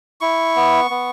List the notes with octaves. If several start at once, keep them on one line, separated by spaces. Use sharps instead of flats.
E4 C#6
B3
B3